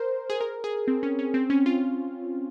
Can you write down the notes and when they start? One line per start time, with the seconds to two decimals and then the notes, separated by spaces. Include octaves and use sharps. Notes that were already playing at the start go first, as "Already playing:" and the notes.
Already playing: A#4 C5
0.30 G#4
0.41 A#4
0.64 G#4
0.88 C4
1.03 C#4
1.19 C#4
1.34 C4
1.50 C#4
1.66 F4